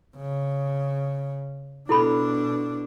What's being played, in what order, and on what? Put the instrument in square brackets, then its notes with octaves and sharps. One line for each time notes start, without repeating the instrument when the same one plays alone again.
[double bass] C#3
[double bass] B2 D4 [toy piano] E4 A4 B5